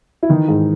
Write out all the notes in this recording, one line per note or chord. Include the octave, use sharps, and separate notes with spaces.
E4
D#3 E3 D#4
G#2